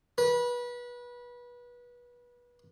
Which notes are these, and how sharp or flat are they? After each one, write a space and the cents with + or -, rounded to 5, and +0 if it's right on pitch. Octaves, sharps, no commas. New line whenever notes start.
B4 -25